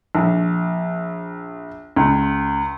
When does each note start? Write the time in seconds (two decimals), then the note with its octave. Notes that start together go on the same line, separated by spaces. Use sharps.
0.15 A#1
1.96 C#2